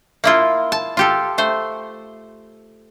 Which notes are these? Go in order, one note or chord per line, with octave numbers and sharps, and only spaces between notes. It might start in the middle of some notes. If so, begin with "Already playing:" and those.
A#3 E4 F4
A5
F4 G4 A4
A3 C5